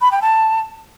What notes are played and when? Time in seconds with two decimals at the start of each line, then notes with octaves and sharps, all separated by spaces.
0.01 B5
0.12 G5
0.22 A5